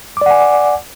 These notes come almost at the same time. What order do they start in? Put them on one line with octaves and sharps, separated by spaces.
D6 D5 F#5 G#5